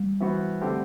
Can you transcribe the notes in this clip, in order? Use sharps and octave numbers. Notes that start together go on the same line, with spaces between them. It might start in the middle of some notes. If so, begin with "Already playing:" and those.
Already playing: G3
E3 B3 F#4 C5
D3 A3 C4 G4